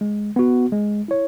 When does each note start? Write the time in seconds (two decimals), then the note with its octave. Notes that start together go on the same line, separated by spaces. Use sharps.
0.01 G#3
0.36 B3 F#4
0.72 G#3
1.08 E4 C#5